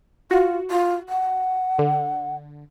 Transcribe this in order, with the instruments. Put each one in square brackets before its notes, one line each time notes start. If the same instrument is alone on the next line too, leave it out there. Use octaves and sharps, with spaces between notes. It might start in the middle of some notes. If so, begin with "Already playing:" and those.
[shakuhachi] F4 [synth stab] F#4
[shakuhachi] F4
F#5
[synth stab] D3